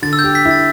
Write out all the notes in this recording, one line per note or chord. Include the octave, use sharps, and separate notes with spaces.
D3 A6
E6
G6
G4
B6
E4
A6